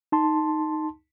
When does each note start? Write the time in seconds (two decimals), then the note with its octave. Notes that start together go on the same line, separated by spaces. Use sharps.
0.12 D#4 A5 C6